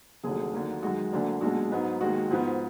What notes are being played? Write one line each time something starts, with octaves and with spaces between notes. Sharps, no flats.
F1 D#2 D3 F#3 G#4
D#2 D3 F#3 A#3
F#2 D#3 G#3 F#4
D2 D3 F#3 A#3 D4
B1 A#2 G#3 D4 F#4
G#2 F#3 B3 D#4
D#2 D#3 G#3 F#4
G#2 F3 B3